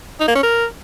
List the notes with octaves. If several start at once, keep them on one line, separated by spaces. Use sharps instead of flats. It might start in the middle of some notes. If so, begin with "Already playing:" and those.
D#4
A#3
C#4
A#4